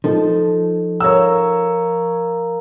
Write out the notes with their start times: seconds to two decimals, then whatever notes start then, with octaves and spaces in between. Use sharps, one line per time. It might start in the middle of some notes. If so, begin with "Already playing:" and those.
0.04 F3 D#4 A4
1.00 A#4 C#5 F5 A#5 E6